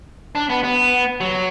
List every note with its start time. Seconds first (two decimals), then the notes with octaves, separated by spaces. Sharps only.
0.35 D4
0.49 B3
0.64 B3
1.20 F#3